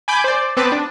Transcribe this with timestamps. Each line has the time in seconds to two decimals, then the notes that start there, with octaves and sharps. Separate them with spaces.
0.08 G#5 B5 D6 G6
0.24 C5 D5
0.57 B3 C4 B4 A5 D6
0.72 D4